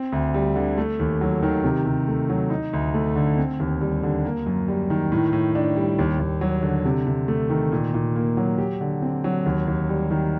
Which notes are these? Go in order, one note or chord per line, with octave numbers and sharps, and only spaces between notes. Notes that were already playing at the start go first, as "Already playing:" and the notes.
Already playing: C4
D2
G3
D3
A3
D#2
F#3
D#3
C3
C3
A3
F#3
D#4
D2
A3
D3
C4
D#2
G3
D3
A#3
F#2
G3
D#3
A2
A2
D4
G3
D#2
D#2
F#3
D3
C3
C3
A3
D#3
A#2
A#2
A#3
F#3
G4
D3
C4
F#3
D#2
D#2
G3
D#3